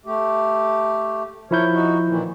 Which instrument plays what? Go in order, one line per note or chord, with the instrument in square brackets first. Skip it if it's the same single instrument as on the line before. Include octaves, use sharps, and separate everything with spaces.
[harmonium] A3 G4
[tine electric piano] F3 E4 G6 [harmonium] A#4 C#5
[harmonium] D#4 F#4
A#2 D#3 E3